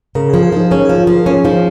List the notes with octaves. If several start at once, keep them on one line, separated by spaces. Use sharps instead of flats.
C#3 A#4
F3 G#4
G#4
F3 D#4
C#4 A#4
F3 G#4
F4
F3
A#4
C#4 G#4
F3 D#4